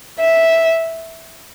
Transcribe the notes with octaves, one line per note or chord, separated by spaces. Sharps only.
E5